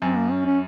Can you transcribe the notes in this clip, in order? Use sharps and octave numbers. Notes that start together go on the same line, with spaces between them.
F#2 C4
A#3
C#4
C#4